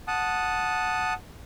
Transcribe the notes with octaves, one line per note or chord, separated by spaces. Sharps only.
F#5 A5 D#6